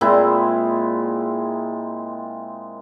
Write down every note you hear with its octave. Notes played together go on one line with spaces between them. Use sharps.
A#2 G#3 C4 E4